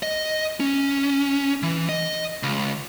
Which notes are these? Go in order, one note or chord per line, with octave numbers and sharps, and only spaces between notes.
D#5
C#4
E3
D#5
C#2